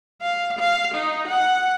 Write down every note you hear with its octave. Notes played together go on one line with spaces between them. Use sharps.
F5
F5
D#4
F#5